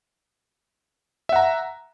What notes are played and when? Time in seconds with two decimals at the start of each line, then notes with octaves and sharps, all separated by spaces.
1.29 E5
1.33 F#5
1.36 A#5